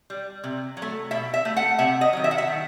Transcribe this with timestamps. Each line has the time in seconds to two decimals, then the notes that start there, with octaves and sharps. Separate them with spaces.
0.10 G3
0.44 C3
0.77 F#3
0.82 A3
1.11 B2 E5
1.34 E5
1.45 A3
1.56 F#5
1.79 C3 E5
2.01 D#5
2.13 D#3 F#3
2.24 E5
2.31 F#5
2.38 E5
2.48 D#3